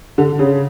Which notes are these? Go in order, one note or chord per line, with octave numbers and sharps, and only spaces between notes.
D3
C#3